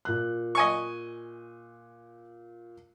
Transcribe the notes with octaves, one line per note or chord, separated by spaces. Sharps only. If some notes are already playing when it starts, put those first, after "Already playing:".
A#2 F#6
D#5 G#5 C#6